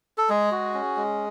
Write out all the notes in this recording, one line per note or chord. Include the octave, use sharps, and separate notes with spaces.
A4
G#3 G#4
F#4
C#4
G#3